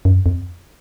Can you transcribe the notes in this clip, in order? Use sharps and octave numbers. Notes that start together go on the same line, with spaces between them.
F#2
F2